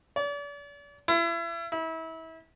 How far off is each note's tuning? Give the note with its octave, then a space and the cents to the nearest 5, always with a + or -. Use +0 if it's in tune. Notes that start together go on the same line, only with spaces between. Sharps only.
D5 -40
E4 +35
E4 -30